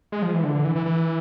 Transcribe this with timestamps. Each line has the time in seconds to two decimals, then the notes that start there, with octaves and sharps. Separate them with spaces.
0.12 G#3
0.22 F3
0.33 E3
0.43 D3
0.55 D3
0.64 E3
0.76 E3
0.86 E3